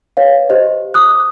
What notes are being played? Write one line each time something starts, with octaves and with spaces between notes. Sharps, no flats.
B4 C#5 F5
G4 C5 D#5
D6 D#6 F#6